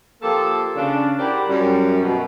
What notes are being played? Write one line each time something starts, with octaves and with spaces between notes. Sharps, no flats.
F3 A#3 G4 A4
C#3 D4
E4 G4 A#4 C5 D5 F#5
F#2 G3
B2